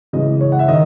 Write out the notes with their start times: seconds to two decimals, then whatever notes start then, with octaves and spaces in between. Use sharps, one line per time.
0.13 C#3 E3 G#3 D#5
0.41 C#5
0.52 F#5
0.59 E5
0.68 D#3 D#5